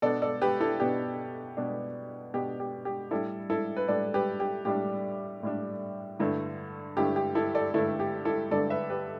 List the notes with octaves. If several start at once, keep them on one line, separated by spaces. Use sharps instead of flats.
B2 B3 D4 A4 D5
A4 D5
G4 B4
E4 A4
B2 B3 D4 G4
B2 B3 D4
B2 B3 D4 G4
G4
G4
A2 G3 D4 E4 A4
E4 A4
B4
A2 G3 D4 A4 D5
G4 B4
G4
A2 G3 D4 G4
A2 G3 D4
G2 D3 A3 E4
G2 D3 A3 E4 G4
G4
E4 A4
A4 D5
G2 D3 A3 E4 A4
G4
E4 A4
G2 D3 A3 E4 A4 D5
B4 E5
G4 B4